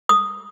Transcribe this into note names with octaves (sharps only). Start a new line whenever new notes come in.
D#6